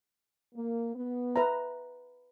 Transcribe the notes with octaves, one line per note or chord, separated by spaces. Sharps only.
A#3
B3
B4 E5 A#5